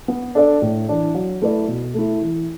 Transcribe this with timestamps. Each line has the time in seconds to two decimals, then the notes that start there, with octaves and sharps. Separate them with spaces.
0.08 B3
0.35 D4 A4 D5
0.62 A2
0.89 E3 D4
1.14 F#3
1.42 A3 E4 B4 D5
1.68 B2
1.94 A3 E4
2.21 E3